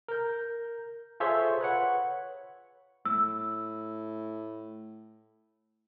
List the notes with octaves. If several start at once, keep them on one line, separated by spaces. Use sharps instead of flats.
A#4 G6
F4 G#4 A4 C5 C#5 E5
B4 C#5 F#5
A2 E6